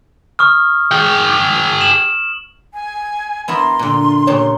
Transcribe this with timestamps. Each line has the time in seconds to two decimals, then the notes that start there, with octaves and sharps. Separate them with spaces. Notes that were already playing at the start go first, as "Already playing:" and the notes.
0.39 C#6 D#6 F6
0.91 G#4 G5
1.81 E7 F#7
2.74 G#5
3.48 B3 E4 A#4 C6
3.79 A#2 D3
4.27 A#2 C#3 G4 C#5